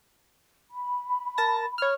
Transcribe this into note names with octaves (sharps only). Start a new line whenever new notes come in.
B5
A#4 A5 A#6
C#5 F6